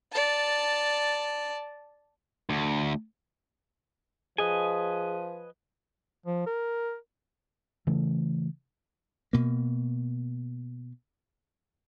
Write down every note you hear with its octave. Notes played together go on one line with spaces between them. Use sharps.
D5 A5
D2
F3 G#4 B4 D#5 G#5
F3
A#4
C#3 E3 A3
B2 A#3